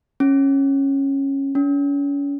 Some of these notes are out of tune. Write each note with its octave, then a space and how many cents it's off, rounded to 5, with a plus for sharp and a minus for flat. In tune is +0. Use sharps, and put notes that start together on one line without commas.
C#4 -15
C#4 +35